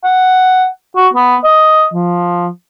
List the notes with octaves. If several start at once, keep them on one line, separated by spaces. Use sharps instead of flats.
F#5
F#4
B3
D#5
F3